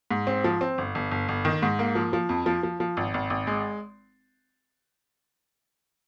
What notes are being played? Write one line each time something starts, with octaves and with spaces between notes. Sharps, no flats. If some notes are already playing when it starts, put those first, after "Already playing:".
G#2
C4
F3
C4
G1
G1
G1
G1
D#3
G#2
A#3
F3
F3
F2
F3
F3
F3
G#1
G#1
G#1
G#3